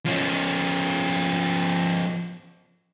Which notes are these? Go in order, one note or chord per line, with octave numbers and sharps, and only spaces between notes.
F3 C#4